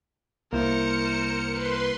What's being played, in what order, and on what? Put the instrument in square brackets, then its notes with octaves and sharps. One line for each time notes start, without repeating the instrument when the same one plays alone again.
[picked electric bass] C2 [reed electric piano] A#3 E4 [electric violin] A#4 C5 [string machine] C#7
[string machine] B4 C6